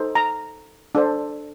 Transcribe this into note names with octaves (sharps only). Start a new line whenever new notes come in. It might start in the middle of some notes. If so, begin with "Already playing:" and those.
Already playing: D#4 A4 C5
A#5
D4 A4 C5